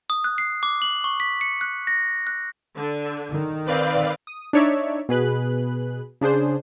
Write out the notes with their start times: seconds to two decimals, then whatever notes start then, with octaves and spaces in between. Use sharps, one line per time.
0.10 D#6
0.24 F#6
0.38 C7
0.63 D6
0.82 F#7
1.04 C#6
1.20 B6
1.41 C#7
1.61 F#6
1.87 A#6
2.27 F#6
2.76 D3
3.31 D#3
3.67 C4 B4 D5 F5
4.27 D#6
4.53 D4 D#4 C#5 D5 E5
5.09 B2 G#4 B4 F#6
6.21 C#3 D4 G#4 C5